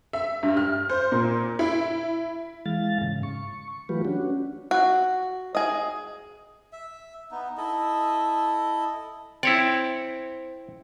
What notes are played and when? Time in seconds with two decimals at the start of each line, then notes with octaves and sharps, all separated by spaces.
0.13 E5
0.43 G2
0.57 F6
0.90 C5
1.12 A#2
1.59 E4
2.66 E3 G#3 F5 A6
3.02 G#2 C#3
3.23 C#6
3.89 E3 F#3 A3 F4 G4 B4
4.05 C#4 D4 F#4
4.71 F#4
5.55 G#4 D#5
6.73 E5
7.31 B3 D#4
7.57 E4 A4 D#5
9.43 C4 E4 C#5 D5